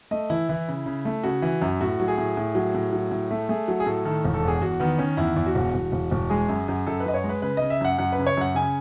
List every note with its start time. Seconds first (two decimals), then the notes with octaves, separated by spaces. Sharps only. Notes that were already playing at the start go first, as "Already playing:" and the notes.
0.11 A3 D#5
0.30 E3 E4
0.49 E3 E4
0.68 C#3
0.86 C#3
1.05 A3
1.23 C#3 F#4
1.42 E3
1.62 F#2
1.81 A2 F#4
2.00 F#3
2.08 G#4
2.18 A2
2.37 A2
2.55 F#3
2.75 A2
2.93 F#3
3.11 A2
3.31 A3
3.49 A3 G#4
3.68 F#3
3.80 G#4
3.86 A2 A4
4.05 D#3 A4
4.24 E1
4.34 A4
4.43 E2 G#4
4.61 E2 F#4
4.80 D#3 B3
4.98 D#3 C#4
5.17 E2 E4
5.36 E2
5.46 F#4
5.55 E1
5.74 E1
5.92 E1
6.11 E1
6.30 G#3 G#4
6.49 F#2
6.68 F#2
6.87 F#2 A4
7.00 B4
7.06 F#2 D#5
7.14 C#5
7.24 G#3
7.29 B4
7.42 C#3 B4
7.57 C#3 D#5
7.70 E5
7.81 F#2 F#5
7.98 F#2 F#5
8.12 B4
8.18 C#3
8.27 C#5
8.37 F#2 F#5
8.55 C#3 G#5